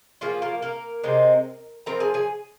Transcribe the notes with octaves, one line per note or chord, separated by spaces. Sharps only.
F3 A#3 F4 G#4
A#3 A#4
A#3 A#4
C3 G#3 C4 D#4
F3 C4 F4 A#4 A#5
G#4 G#5
G#4 G#5